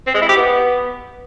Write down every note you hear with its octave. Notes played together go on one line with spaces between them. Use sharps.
C4
G#3
E4
G4
B3